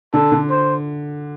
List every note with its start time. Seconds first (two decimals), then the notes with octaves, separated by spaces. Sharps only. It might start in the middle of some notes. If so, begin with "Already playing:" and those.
0.13 D3 A4
0.32 D3
0.50 C5